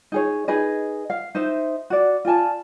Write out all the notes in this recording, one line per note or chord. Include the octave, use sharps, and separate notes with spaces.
D#4 G#4 C#5
D#4 G#4 B4 D#5
F5
D#4 C5 E5
F#4 D5
F4 D5 G#5 A5